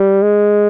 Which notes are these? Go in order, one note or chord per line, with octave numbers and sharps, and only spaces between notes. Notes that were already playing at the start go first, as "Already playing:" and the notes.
Already playing: G3
G#3